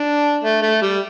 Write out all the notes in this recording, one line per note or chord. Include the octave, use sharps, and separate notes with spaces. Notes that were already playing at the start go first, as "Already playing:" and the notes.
Already playing: D4
A3
A3
G3